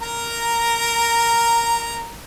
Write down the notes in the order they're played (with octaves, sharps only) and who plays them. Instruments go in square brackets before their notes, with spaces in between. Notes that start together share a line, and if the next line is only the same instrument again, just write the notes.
[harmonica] A#4 A#5